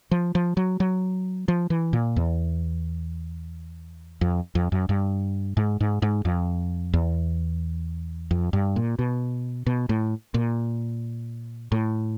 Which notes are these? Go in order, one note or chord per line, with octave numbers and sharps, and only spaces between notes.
F3
F3
F#3
F#3
F3
E3
A#2
E2
F2
F2
F#2
G2
G#2
G#2
G#2
F2
E2
F2
G2
A#2
B2
B2
A2
A#2
A2